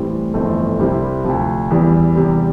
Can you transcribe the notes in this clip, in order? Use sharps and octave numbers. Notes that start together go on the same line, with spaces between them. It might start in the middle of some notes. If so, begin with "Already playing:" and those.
Already playing: A2 E3 G3 C4
G1 F2 E3 A3 C4
C2 C3 G3 C4 E4
D2 C3 F3
E2 E3 G3
E2 C3 G3